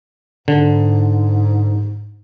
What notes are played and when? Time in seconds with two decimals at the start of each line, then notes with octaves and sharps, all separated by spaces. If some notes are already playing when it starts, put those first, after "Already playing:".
0.48 G#2 D3